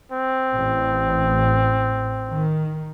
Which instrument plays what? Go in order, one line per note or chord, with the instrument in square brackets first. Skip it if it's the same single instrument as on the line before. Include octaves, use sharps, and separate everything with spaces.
[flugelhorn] C4
[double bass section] A1
D#3